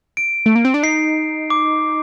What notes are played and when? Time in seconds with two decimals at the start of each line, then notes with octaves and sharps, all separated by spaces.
0.17 D7
0.46 A3
0.56 A#3
0.65 C4
0.74 D4
0.83 D#4 C7
1.50 D6